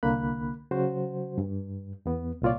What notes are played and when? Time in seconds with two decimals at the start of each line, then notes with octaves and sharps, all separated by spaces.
0.03 C2 D3 A#3 B5 F#6
0.71 C#3 F#3 F#4 C5
1.38 G2
2.06 E2 B3
2.42 C2 A#2 F4 C#5 D5